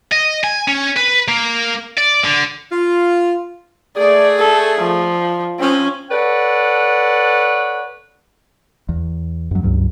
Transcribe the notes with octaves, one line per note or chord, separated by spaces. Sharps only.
D#5
G#5
C#4
B4
A#3
D5
D3
F4
A3 G#4 D5
A4
F3
F3 C4 C#4
A4 B4 C#5 D5 F#5
E2
F#2 F#3
C#2 G2 F#3